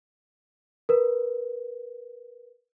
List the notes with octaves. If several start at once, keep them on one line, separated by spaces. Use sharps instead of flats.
A#4 B4